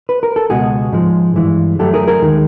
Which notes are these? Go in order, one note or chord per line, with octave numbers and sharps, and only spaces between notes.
B4
A#4
A4
C#2 B2 G#3 F#4 G#4
G#2 F3 G#3
G2 E3 G#3
F#2 D3 F#3 A3 G4 A4
G#4 A#4
G#4 A#4
D#2 D#3 G#3